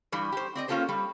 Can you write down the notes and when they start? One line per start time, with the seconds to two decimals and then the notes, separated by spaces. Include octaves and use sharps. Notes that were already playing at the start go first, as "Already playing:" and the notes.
0.12 G2 E3 G3
0.32 G4 C5
0.55 C4 D5 D#5
0.68 A#3 C#4 F4 G4 A4 C5
0.89 G3